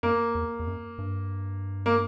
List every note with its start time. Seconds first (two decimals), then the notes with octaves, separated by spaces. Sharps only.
0.03 F#2 A#3
0.35 E2
0.59 E2
0.67 F#2
0.98 G2
1.86 A#3